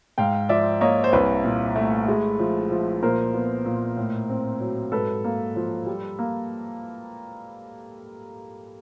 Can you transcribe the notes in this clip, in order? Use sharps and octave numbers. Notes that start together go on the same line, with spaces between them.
G#2 F5 G5
F3 D5 E5
A#3 C#5 D#5
C5
C2 B4 C#5
A#2
A3
G#3
F3
F3
A#2 A#4 C5
B3
A#2
A2
C4
F#3
G#2 A4 B4
A#3
F3
G3
A#3